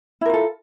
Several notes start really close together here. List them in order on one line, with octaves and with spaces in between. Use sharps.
E4 A#4 F4 A4